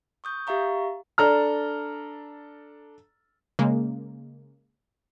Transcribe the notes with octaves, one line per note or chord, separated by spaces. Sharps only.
C#6 D#6 G6
G4 E5 F5 A#5 C#6
D4 A4 A#5 F6
C#3 G#3 A#3